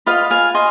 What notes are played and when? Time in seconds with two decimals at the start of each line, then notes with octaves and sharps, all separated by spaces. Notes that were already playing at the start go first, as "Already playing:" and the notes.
0.06 F4 B4 D#5 F5
0.31 F5 G#5
0.54 D#5 G#5 C6